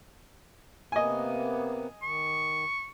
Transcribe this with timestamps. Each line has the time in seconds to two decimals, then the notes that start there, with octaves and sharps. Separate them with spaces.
0.92 C3 A#3 B3 D#5 G#5
2.02 D#3 C#6